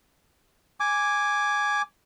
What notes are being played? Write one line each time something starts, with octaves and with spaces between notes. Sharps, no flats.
G#5 D6